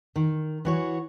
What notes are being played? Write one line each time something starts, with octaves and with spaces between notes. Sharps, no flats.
D#3
E3 F#4 C#5